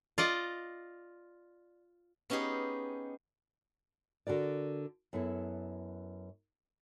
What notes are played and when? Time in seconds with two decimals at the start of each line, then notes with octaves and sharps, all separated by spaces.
0.18 F4 D5 D#5
2.30 B3 C#4 D#4 G4 G#4
4.27 D3 F#4 A#4 D5
5.13 F#2 B3 E4 A4